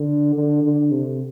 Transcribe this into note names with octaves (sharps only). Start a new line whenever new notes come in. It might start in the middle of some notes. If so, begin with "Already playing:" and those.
Already playing: D3
D3
D3
C3